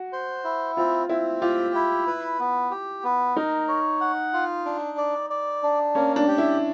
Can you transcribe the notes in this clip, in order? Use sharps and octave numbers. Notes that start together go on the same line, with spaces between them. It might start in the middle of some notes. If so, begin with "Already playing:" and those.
Already playing: F#4
C5
E4
C4 F4
C4 E4
F4 G4
E4
B4
B3
G4
B3
D#4 A#4
C#5
F#5
F4
D4
D5
D5
D4
A#3 C#4
D4
G4
E4